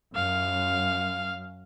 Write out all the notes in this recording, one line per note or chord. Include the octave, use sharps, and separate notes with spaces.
F#2 F5